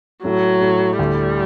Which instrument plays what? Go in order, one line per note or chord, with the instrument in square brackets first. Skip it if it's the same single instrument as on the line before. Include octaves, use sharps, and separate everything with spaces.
[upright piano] A2 [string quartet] F#3
[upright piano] A2
[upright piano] D2 [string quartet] G3